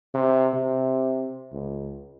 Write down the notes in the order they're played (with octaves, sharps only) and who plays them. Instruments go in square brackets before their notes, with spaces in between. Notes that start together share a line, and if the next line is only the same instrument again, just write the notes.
[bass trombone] C3
C3
C#2